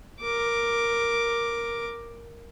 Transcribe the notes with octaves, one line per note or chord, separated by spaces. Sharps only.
A#4 D6